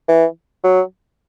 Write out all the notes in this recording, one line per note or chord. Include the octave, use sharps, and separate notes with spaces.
E3
F#3